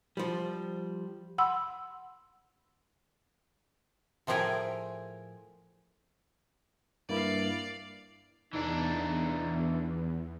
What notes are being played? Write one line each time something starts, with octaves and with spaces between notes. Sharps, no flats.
F3 G3
F#5 B5 C6 E6
A2 F3 A3 G#4 A#4 G5
G2 A#3 E4 D5 F5
E2 E3 D4 D#4